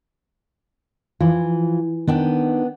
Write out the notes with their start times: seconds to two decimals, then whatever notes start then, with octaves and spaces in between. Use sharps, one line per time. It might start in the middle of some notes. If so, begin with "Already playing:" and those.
1.20 E3 F3
2.07 D#3 B3 D4 G5